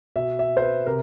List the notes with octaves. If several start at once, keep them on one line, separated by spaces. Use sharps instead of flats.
B2 E5
E5
C5
B4
C3 A#4